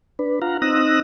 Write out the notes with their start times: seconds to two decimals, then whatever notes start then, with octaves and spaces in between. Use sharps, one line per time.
0.19 D4 B4
0.42 F4 F5 F#5 A#5
0.62 C4 D#4 D#6 E6 F#6 A#6